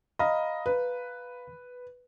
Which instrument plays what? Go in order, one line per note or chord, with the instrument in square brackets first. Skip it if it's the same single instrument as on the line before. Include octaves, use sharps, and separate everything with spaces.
[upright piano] D#5 [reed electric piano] F5 A#5 B5
[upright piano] B4